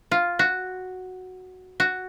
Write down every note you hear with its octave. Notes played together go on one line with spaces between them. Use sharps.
F4
F#4
F#4